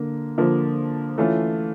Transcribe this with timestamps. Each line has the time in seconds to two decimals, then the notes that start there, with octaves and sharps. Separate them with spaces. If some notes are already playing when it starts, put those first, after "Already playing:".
Already playing: D3 A#3
0.38 D3 F3 A#3
1.18 E3 A3 C#4 F4